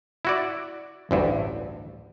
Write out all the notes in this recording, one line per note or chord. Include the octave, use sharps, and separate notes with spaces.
E4 F#4 D5
A1 D2 G2